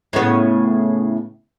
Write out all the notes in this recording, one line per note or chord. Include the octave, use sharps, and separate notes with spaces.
A2 C#3 B3